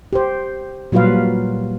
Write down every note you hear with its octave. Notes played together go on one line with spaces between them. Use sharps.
G4 C5
A#2 F#3 G3 F4 B4 F5